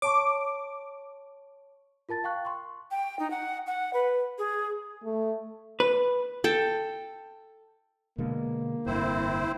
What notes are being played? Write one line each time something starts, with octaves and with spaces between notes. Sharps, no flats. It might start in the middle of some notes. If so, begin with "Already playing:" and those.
C#5 A5 C#6 D6
F4 A#4 A5 A6
F5 G5 C#6 F#6
C6 C#6
G5
D#4
F#5
F#5
B4
G#4
A3
B4
A4 G5
B2 D3 G#3 A#3
F1 G2 D3 C4 E4 C5